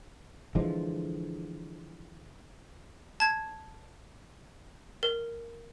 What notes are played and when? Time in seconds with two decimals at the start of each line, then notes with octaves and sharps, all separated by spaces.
0.55 D3 E3 F3 G#3
3.20 A5 G#6
5.03 A#4